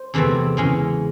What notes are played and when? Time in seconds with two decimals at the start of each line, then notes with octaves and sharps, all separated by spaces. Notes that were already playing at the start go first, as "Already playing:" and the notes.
Already playing: C5
0.14 E2 C3 E3 A3 C4
0.57 C#3 E3 G#3 C#4